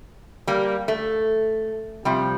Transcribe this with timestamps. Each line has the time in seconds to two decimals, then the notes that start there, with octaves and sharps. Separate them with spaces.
0.47 G3 A#3
0.88 A3
2.05 C3 F3 G3